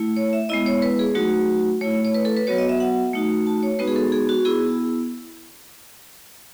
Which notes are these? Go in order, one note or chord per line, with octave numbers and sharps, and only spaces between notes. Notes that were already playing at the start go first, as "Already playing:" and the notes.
Already playing: A3 E4
C#5
E5
G#3 B3 E4 D#5
C#5
B4
G#4
F#3 A3 D#4 F#4
A3 E4 C#5
C#5
B4
A4
B4
F#3 B3 F#4 C#5
D#5
E5
F#5
A3 D#4 F#4
A5
C#5
G#3 B3 D#4 F#4 B4
G#4
A4
G#4
F#4
B3 E4 G#4